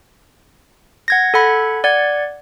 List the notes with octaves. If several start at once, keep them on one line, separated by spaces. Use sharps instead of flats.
F#5 G#6 A#6
A4 F#5 B5 G#6
D5 F#5 G#6